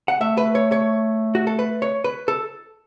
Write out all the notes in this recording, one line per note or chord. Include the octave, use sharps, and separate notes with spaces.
F#5
A3 E5
B4
C#5
C#5
F#4
A4
B4
C#5
B4
A4